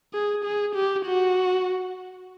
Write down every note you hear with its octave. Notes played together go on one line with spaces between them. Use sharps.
G#4
G#4
G4
F#4